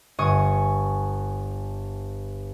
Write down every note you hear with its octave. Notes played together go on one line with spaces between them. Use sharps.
G1 G#5 C#6 D#6